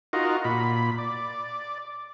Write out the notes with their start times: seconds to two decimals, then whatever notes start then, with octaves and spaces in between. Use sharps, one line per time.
0.13 D#4 F4 F#4 A#4
0.44 A#2 B5
0.98 D5